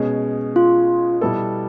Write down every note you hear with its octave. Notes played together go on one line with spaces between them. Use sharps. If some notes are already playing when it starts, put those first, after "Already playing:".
Already playing: B2 G#3 C#4
F4
B2 G3 B3 E4 A4